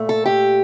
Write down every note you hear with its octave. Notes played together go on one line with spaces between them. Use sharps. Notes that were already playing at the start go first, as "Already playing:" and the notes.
Already playing: A#2 A3
A4
G4